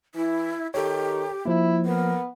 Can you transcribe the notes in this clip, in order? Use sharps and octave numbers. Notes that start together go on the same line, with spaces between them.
E3 E4
D#3 G4 A4 C#5
F3 A#3 E4
B3 A#4